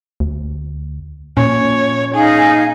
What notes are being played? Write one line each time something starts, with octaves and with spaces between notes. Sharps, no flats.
D2
A#2 C#4 C#5
D#4 G#4 F5 G#5